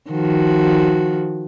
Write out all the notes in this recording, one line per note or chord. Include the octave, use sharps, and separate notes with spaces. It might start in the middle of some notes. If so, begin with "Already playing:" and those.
D#3 F3 F#4